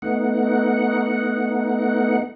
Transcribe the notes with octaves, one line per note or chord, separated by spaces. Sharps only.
A3 B3 D#4 F#5